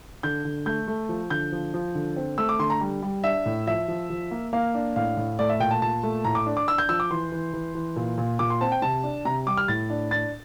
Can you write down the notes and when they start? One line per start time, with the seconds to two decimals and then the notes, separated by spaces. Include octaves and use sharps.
0.23 D3 G6
0.45 D3
0.66 A3 G6
0.88 A3
1.09 F3
1.30 D3 G6
1.52 F3
1.74 F3
1.95 D3
2.16 C4
2.38 A3 E6
2.49 D6
2.59 D3 C6
2.70 A#5
2.81 G3
3.02 G3
3.24 D4 E5
3.46 A2
3.67 F3 E5
3.88 F3
4.10 F3
4.31 A#3
4.53 A#3 F5
4.74 D4
4.96 A2 F5
5.17 A2
5.39 A3 D5
5.49 E5
5.60 A#2 G5
5.71 A5
5.82 A#2 A5
6.03 A3
6.24 A2 A#5
6.35 D6
6.46 D4
6.57 D6
6.68 D4 E6
6.78 G6
6.89 F3 E6
7.00 D6
7.11 E3 C6
7.32 E3
7.54 E3
7.75 E3
7.96 A#2
8.18 A#2
8.39 A#2 D6
8.50 C6
8.61 C4 A5
8.72 G5
8.82 C3 A5
9.03 D4
9.25 C3 A#5
9.47 G3 D6
9.57 F6
9.68 A2 A6
9.90 D4
10.11 D4 A6